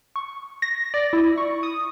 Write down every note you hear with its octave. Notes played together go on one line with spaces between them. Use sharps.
C#6
A#6
D5
E4
C#6
D#6